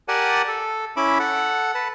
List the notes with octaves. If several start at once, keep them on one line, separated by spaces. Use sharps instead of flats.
G4 A#4 D5 F#5 G#5 A5
A4
C#4 E4 E5 B5 D6
A4 F#5
B4 A5